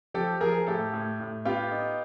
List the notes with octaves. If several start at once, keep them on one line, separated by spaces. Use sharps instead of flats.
F3 G4 A4
F3 G#4 A#4
A2 G4 A4
A2
A2
B3 F4 G4
D#4